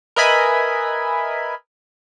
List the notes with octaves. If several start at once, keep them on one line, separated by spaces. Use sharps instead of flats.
A#4 B4 D#5 E5 G#5 B5